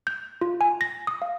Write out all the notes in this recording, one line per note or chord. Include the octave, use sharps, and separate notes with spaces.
G6
F4
G#5
A#6
D#6
F5